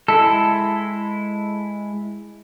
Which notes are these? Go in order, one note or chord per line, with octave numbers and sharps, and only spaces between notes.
G#3 E4 A4